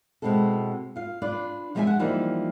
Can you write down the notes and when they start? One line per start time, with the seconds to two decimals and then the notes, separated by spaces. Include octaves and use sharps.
0.22 B2 G#3 C4 E4 A4
0.96 F4 F5
1.22 D4 F4 B4 D5
1.75 F3 G#3 B3 D5 E5 G#5
1.87 G#3 F#5
1.99 E3 F3 G3 A#3 D#4